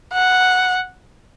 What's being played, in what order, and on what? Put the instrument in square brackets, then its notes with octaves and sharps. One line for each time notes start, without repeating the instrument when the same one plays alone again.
[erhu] F#5